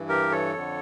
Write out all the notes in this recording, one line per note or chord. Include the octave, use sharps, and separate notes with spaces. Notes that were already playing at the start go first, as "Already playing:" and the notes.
Already playing: G2 E3
G4 A#4
A4 C#5
F2 D3